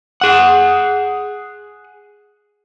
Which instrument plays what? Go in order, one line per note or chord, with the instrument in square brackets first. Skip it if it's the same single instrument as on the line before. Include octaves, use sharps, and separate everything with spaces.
[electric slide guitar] G#4 F#5